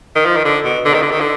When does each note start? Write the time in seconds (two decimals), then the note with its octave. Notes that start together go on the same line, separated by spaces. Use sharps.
0.16 D#3
0.26 F3
0.37 D#3
0.45 D3
0.65 B2
0.85 D3
0.94 D#3
1.03 D3
1.12 D#3
1.21 D3